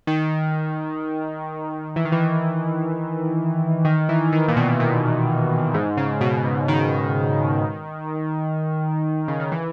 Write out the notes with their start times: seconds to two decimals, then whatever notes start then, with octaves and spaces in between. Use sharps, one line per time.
0.07 D#3
1.96 E3
2.05 D#3
2.12 E3
3.85 D#3
4.09 E3
4.32 D#3
4.48 A#2
4.56 B2
4.80 A#2
5.74 G#2
5.97 C#3
6.21 B2
6.44 G#2
6.68 D#3
9.28 C#3
9.40 D#3
9.52 E3